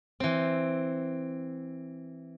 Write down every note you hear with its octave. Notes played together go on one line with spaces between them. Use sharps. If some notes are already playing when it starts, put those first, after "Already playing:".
E3 C4